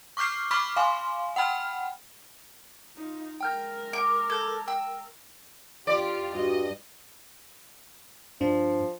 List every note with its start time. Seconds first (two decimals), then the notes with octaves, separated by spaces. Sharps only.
0.17 C#6 D6 F6 G6 C7
0.51 B5 C#6 D6 F6 B6
0.76 F5 G#5 C6
1.36 F#5 G5 B5 F6
2.96 D#4 F4
3.41 G#3 A#4 G5 F6 G6
3.93 D6
4.30 A4 G6 G#6
4.68 G5 E6
5.87 E2 F4 G4 D5
6.34 G2 F#4 D#5
8.41 G2 F3 D4